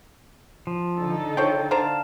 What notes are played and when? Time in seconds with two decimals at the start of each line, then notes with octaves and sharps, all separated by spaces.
0.67 F3
0.97 D3 D#4 A4
1.37 F3 C5 C#5 G5
1.71 D3 C5 F5 A5 A#5